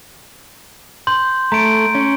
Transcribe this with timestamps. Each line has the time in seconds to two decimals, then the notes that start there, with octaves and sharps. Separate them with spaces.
1.07 C6 G6 F#7
1.52 A3 A#5 D7
1.95 C#4